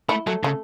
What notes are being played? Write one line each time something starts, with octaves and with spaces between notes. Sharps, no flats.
A3 E4
F#3 A3
C#3 A3